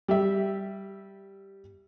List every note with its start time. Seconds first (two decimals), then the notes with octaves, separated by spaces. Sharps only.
0.08 G3 G4 E5